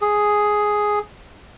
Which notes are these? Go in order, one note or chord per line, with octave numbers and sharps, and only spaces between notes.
G#4